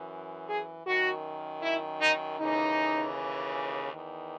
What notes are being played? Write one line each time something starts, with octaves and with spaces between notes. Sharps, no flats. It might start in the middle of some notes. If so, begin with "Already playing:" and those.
Already playing: F#2 E3
G#4
F#2 D#3 F#4
E4
D#4
D#2 C#3 E3 D#4
E2 D#3